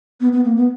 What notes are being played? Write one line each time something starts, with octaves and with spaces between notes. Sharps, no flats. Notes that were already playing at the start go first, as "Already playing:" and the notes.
B3
B3
A#3
B3